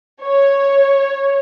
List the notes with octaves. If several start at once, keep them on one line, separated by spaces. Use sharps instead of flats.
C#5